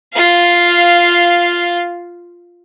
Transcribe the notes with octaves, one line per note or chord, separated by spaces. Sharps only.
F4 F5